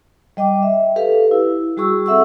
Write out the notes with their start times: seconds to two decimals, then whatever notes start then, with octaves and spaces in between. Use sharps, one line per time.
0.37 G3 D#5 G5 D6
0.62 E5
0.96 G4 A4 B4 F5
1.31 E4
1.77 G3 F#4 G#4 C#6 E6
2.06 C4 A4 E5 F#5 C#6 E6